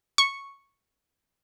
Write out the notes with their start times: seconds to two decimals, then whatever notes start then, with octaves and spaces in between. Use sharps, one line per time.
0.18 C#6